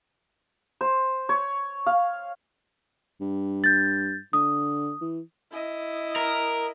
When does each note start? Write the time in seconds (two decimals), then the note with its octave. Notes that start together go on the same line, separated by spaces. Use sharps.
0.81 C5
1.29 C#5
1.86 F5
3.21 G2
3.64 G6 A6
4.33 D3 D#6
5.01 E3
5.52 E4 D#5
6.16 A#4